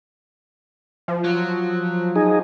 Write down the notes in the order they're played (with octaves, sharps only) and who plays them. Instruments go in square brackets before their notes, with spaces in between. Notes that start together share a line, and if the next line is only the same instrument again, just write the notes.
[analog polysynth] F3
[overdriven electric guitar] F#3
[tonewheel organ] D#4 G#4